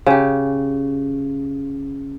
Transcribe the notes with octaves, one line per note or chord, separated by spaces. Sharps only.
C#3 G4